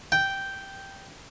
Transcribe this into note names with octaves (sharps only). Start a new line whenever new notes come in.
G5